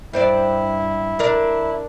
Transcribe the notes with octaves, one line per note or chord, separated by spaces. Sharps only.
G2 E4 C5 D5
D4 A#4 D5